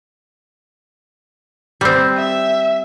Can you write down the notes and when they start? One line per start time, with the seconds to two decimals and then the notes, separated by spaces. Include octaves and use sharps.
1.81 G3 C4
2.17 E5